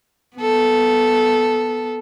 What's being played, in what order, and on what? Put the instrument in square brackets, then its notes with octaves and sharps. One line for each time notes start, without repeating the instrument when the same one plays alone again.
[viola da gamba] B3 A4